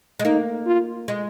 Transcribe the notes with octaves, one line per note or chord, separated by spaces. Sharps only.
G#3
A#3 D#4
F4
G#3